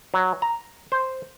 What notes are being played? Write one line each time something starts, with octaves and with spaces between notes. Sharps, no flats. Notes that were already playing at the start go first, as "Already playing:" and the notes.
F#3
A#5
C5